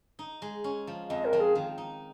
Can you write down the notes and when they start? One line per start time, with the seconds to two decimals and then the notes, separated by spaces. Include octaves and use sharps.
0.19 D#4
0.42 G#3
0.64 C#4
0.87 F3
1.10 F2 D#5
1.25 A#4
1.33 F3
1.40 G#4
1.55 D#3
1.78 D#4